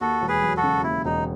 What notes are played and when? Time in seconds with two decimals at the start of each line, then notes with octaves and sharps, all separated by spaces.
0.01 D#2 F#4 A4
0.22 E1
0.28 G#4 B4
0.42 F#3
0.57 F#4 A4
0.63 C#3
0.83 D#2 E4
1.05 E1 D#4